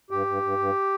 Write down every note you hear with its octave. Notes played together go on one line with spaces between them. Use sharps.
G2 G4
G2
G2
G2